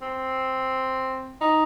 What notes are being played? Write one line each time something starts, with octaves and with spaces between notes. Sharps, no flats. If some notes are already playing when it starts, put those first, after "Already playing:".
C4
D#4